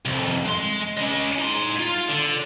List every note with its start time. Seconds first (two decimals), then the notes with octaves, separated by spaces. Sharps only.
0.06 C2 F2
0.46 G#3 C6
0.98 C#4 D#5
1.38 D#4 C6
1.79 F4
2.08 D3